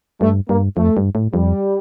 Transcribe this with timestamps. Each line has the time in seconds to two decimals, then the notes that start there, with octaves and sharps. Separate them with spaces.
0.21 G2 A3
0.49 G2 A#3
0.77 F2 A3
0.97 G2
1.15 A2
1.33 F2 G3